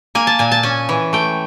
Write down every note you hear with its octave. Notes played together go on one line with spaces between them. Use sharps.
A#3 G#5
A5
A#2 G#5
A5
C#4 G#5
E3
A3 G5